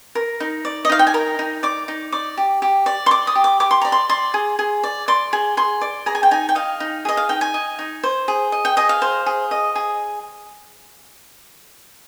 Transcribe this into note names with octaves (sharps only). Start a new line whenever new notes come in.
A#4
D#4
D5
D#5
D#4 F5
G5
G#5
A#4 A#5
D#4
D5 D6
D#4
D5 D6
G4
G4
D5
C6
D5 D6
D#6
G4
D6
G4 D6
C6
D5 A#5
C6
D5 C6
G#4
G#4
D5
D5 C6
G#4
G#4 C6
D5
G#4 A#5
G#5
G5
D#4 G#5
G5
D#5 F5
D#4
G#4 D#5
F5
D#4 G5
G#5
D#5
D#4
C5
G#4
D#5
G5
G#4 D#5
F5
C5
G#4
D#5
G#4